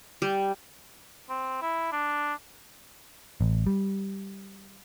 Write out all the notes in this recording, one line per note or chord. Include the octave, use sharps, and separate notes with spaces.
G3
C4
E4
D4
A1
G3